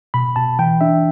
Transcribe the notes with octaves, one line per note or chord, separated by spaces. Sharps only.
B2 B5
B2 A5
E3 G5
D4 E5